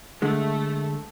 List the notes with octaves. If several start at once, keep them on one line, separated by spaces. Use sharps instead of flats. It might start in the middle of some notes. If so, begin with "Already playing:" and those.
D3 G#3 A3